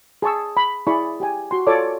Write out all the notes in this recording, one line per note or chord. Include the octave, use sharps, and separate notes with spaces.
G#4 A5 C#6 E6
B5
E4 G#4 D5 B5 C#6
G4 G5 G#5
F#4 C6
F4 A4 C#5 D5 D6